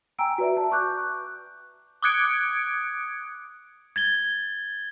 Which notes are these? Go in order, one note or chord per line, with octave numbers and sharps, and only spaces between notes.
G5 G#5 A#5 E6 D7
F#4 B4 D5 E5
A5
C#6 D6 F#6 G6
D6 D#6 F#6 G#6 C#7 D7
G#6 A6 G7